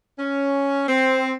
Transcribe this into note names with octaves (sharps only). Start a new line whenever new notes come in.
C#4
C4